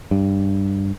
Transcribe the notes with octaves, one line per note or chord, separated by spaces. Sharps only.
G2